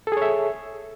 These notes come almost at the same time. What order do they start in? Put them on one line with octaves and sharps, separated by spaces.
A4 G#4 C#5 E5